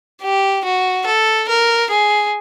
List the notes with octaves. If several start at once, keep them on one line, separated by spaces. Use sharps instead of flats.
G4
F#4
A4
A#4
G#4